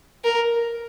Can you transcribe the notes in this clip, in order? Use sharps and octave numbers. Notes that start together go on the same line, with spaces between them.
A#4